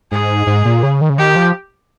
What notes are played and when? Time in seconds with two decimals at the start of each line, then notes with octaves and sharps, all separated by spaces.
0.12 G#2 G#4
0.47 G#2
0.65 A#2
0.83 C#3
1.01 D#3
1.10 C#3
1.18 D#3 G4
1.36 F3